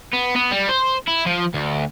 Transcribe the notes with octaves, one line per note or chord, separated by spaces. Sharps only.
B3
B3
G3
C5
E4
F3
D2